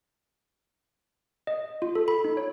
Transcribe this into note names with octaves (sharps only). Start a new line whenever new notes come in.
D#5
F4
A4
B5
D#4
C#5